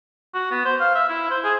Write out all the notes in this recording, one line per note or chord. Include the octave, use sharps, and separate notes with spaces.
F#4
B3
C5
F5
E5
E4
C5
G#4